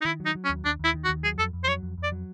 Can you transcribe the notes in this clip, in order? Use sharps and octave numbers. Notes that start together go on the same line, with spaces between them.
D#4
D#3 E4
F#3
D#4
F#3
C#4
D#2
D#2 D4
D#2 E4
D#3
F#4
D#2
F#3 G#4
F2 A4
F2
C5
F#3 C#5
F2
F2
D5
F#3